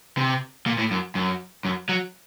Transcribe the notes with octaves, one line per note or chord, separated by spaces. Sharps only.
C3
A#2
A2
F#2
F#2
F#2
F#3